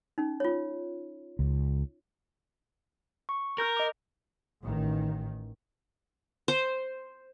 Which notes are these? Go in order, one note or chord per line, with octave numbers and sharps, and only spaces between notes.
C#4 D#4
F4 C#5
C#2
C#6
A#4 F6 G6 A#6
D#5 D6
A1 D#3
C5